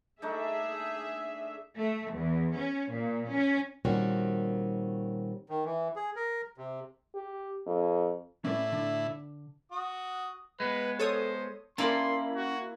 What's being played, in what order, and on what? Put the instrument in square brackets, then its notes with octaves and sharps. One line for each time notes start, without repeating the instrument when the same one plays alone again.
[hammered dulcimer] A3 D4 D#4 [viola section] G#4 E5
[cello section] A3
E2
C#4
A#2
C#4
[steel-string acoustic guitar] A#2 D#3 G3 C4 C#4 F#4
[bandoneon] D#3
E3
G#4
A#4
C3
[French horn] G4
F2
[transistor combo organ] A2 E4 [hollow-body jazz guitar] C#4 B4 D5
[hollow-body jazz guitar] D3 D4
[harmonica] F#4 D#6
[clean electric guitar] G#3 B3 [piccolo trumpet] B4
[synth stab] A4 C#5 D#6 [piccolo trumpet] C5
[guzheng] A#3 E4 [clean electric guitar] C#4 B5 [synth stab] A#4 D5 A5 [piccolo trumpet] C6
[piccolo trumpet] F#4